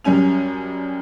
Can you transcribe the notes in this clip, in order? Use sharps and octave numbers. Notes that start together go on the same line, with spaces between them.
F#2 G3 C#4 G#5 F7